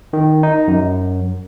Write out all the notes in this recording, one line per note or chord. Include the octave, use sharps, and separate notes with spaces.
D#3
D#4
F#2